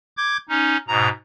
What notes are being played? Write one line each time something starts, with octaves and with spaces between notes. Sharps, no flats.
D6 G6 G#6
C#4 D#4
G#2 B2 A#5